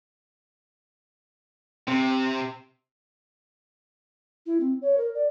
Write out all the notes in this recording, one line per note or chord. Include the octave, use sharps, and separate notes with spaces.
C3 C4
E4
C4
C#5
A#4
D5